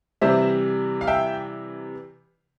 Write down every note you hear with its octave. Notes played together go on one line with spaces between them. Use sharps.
C3 E3 G3 C5 E5
F5
E5 G5